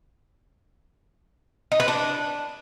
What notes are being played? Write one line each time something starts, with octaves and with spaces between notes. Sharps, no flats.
D#4
B4
D4